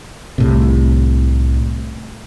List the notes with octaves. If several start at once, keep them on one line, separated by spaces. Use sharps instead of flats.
C2 A2 C3